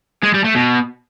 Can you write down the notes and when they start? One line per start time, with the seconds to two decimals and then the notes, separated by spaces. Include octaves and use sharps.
0.23 G#3
0.34 G3
0.44 A3
0.55 B2